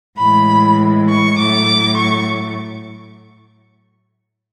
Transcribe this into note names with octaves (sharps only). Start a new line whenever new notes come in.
A2 E3 G#3 B5
C#6
A2 F#3 A3 D6
C#6